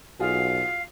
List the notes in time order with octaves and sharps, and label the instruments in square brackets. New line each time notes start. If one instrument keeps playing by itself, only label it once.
[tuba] B1 [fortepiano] F4 F#4 G#4 [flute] F5